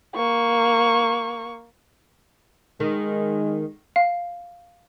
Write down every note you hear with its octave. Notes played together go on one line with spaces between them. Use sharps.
A#3 C#6
D#3 G#3
F5